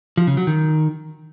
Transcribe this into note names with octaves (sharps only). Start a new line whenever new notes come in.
F3
C#3
F#3
D#3